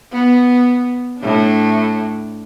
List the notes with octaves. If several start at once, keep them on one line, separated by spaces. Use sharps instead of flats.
B3
A2 D4